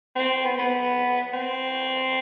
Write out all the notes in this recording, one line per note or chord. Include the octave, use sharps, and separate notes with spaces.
C4
B3
B3
C4